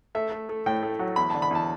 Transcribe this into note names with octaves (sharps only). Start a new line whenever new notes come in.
A3 E5
A3
A3
A2 G5
A3
F#3
E2 B5
D3 A5
B5
E2 A5